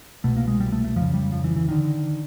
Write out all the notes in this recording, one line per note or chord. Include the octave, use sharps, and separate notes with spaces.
C2 B2 A3
A#3
G#3
G3
A3
A3
F2 C#3 F3
G3
F3
E3
E3
D3 D#3